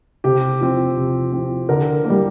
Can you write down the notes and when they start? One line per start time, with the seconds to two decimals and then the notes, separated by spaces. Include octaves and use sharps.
0.24 C3 G4
0.61 F3 C4
0.97 C3
1.33 F3 C4
1.69 D3 A#4
2.05 G3 A#3